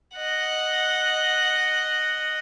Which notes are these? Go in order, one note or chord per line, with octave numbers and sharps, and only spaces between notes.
D#5 F#5